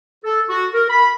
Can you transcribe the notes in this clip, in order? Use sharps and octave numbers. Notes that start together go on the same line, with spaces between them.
A4
F#4
A#4
B5